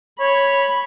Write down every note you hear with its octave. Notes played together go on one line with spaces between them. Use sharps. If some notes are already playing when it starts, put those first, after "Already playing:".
C#5 B5